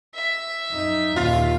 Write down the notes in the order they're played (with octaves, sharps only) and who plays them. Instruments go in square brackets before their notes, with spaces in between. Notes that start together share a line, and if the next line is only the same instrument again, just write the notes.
[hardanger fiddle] E5
[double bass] F#2 D#4
[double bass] D#2 A#2 [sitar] F4